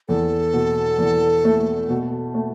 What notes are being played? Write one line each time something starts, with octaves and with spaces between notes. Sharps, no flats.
E2 A4
B2
E2
A3
B2
A3